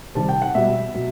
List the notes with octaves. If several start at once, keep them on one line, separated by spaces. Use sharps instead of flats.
C3 D#3 G3 A5
G5
F#5
B2 G3 E5
B2 F#3